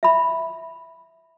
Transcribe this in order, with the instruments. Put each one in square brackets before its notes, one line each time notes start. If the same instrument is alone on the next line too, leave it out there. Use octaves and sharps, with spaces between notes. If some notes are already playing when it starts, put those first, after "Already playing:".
[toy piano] E5 B5